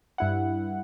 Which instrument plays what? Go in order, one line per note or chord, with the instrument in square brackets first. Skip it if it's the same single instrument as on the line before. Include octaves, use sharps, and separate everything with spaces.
[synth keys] G2 E4 F#5